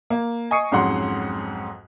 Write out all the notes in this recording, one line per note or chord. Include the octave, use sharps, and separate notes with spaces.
A#3
D#5 G#5 C#6 D#6 C7 C#7
B1 F2 G#2 C#4 F#5 C6